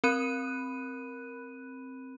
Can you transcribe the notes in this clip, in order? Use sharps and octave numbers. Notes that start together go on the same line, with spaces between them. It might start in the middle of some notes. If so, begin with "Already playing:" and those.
C4 A#4 B5 F#6 D#7